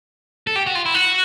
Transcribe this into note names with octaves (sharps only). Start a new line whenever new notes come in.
A4
G4
F#4
F4
E4
F#4